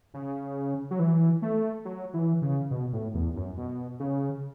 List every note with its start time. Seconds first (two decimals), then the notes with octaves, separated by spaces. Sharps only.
0.14 C#3
0.91 F#3
0.99 E3
1.42 A3
1.85 F#3
2.14 E3
2.42 C#3
2.71 B2
2.93 A2
3.14 E2
3.36 F#2
3.57 B2
4.00 C#3